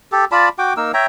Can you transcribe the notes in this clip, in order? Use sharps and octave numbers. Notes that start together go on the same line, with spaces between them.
G4 A4
F4 D5 A5 B5
F#4 G5 D6
A#3 D#4 A#4 E6
C#5 E5 G5 A#5